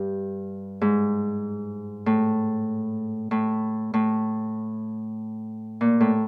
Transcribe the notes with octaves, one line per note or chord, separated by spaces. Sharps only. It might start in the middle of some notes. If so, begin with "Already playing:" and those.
Already playing: G2
G#2
A2
A2
A2
A#2
A2